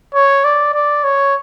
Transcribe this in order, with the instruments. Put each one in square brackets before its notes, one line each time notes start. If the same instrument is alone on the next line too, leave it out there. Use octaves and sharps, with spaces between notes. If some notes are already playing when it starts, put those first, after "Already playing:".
[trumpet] C#5
D5
D5
C#5